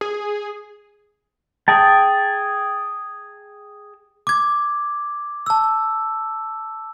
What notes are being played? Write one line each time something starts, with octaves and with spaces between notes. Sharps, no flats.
G#4
G#4 G5 A5
D6 G#6
A5 E6